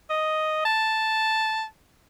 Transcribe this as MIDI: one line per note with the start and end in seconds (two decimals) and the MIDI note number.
0.10 0.60 75
0.65 1.65 81